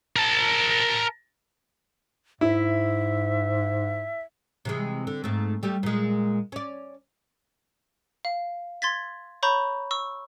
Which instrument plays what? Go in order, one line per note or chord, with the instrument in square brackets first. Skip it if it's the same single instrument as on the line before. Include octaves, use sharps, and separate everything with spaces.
[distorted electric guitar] A#4 A5
[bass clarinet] G#2 [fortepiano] E4 [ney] E5
[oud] C3 E3 G#3
D3
G#2 A3
G3 A3 G4
A#2 G#3
C#4 D5
[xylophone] F5
C6 G#6 A6 B6
C#5 A#5 B5 C#6 G6
C#6 E6